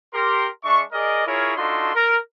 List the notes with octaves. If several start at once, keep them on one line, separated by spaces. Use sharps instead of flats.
G4 A#4 C6
G#3 D4 E5 C#6
G#4 A#4 D5 D#5
E4 F4 G#4 A#4 C#5
D4 D#4 F4 F#4 A4 C6
A#4